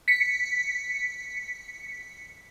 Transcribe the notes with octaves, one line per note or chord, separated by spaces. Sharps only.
B6 C#7